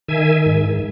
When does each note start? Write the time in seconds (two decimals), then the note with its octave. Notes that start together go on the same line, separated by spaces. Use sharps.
0.08 D#3 E5 G#5
0.46 G#2